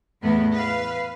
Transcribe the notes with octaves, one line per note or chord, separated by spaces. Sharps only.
E2 A2 B3
B4 F5